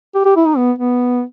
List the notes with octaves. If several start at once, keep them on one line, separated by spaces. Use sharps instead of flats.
G4
G4
E4
D#4
B3
B3